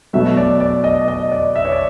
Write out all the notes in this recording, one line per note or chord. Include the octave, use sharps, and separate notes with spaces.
B2 F#3 A3 E5
D5
D5
D#5
D#5
D5
E5
C#5
D5